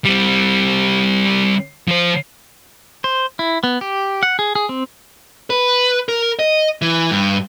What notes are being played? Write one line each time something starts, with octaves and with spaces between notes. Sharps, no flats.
G3 C4
F3 C5
C5
E4
B3
G4
F#5
G#4
G#4
C4
B4
A#4
D#5
E3
G2